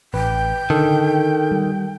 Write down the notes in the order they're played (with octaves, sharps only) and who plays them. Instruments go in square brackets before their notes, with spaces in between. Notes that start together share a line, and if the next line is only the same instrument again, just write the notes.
[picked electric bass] A1 [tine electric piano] B4 [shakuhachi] G5
[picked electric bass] D3 [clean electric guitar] D#3 [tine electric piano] A4
[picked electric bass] G3